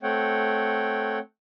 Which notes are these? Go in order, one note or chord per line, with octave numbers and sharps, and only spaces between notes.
A3 C4 C#5 F#5 G5